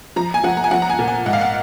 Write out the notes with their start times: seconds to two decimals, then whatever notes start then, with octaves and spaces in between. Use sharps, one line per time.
0.16 F3 A#5
0.34 G#5
0.44 F3 F#5
0.57 A#5
0.64 G#5
0.71 F3 F#5
0.82 A#5
0.90 G#5
0.99 A#2
1.08 G#5
1.26 G#2 F#5
1.33 F5
1.41 F#5